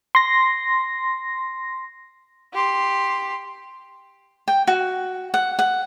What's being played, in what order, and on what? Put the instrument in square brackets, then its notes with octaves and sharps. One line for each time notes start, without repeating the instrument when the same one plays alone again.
[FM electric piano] C6 A#6
[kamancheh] G4 C6
[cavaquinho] G5
F#4
F#5
F#5